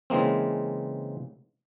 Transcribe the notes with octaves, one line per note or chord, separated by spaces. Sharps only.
C#3 E3 G#3 A#3 C4